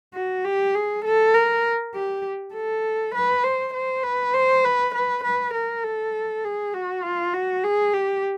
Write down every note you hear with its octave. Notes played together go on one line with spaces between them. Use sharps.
F#4
G4
G#4
A4
A#4
G4
A4
B4
C5
C5
B4
C5
B4
B4
B4
A#4
A4
G#4
F#4
F4
F#4
G#4
G4